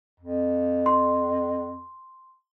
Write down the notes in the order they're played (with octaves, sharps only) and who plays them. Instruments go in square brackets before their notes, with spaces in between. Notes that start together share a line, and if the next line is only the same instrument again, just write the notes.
[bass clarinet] F2
[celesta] C6